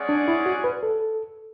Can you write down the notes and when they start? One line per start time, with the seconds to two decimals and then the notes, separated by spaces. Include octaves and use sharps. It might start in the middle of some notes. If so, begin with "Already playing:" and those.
Already playing: G#3 C#4 G#4 D5 F#5
0.09 D4
0.28 E4
0.46 F#4
0.64 B4
0.83 A4